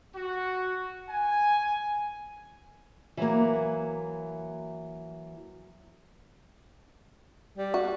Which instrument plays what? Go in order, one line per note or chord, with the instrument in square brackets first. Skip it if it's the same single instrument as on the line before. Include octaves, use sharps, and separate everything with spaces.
[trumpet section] F#4
G#5
[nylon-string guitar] E3 F#3 A#3
[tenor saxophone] G3
[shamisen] F#4